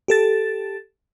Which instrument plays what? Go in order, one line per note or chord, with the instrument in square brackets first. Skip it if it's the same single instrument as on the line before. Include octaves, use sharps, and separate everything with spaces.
[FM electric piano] G4 A4 A6